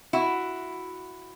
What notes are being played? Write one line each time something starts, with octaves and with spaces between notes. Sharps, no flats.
E4 F#4